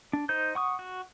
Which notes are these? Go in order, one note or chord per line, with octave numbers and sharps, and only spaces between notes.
D4
D#4 C5 G6
F#5 C#6 D#6
F#4